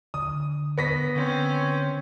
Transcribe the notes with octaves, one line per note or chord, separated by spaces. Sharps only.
D3 D#6
B3 A#6 B6
D3 C4 C#4